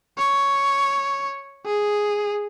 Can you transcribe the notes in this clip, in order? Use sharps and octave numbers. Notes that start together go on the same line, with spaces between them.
C#5
G#4